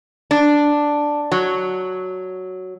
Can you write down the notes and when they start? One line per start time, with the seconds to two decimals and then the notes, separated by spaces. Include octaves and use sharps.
0.31 D4
1.32 F#3